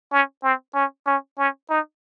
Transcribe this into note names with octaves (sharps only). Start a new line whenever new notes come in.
C#4
C4
C#4
C#4
C#4
D#4